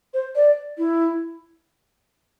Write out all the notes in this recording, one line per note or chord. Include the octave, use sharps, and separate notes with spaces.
C5
D5
E4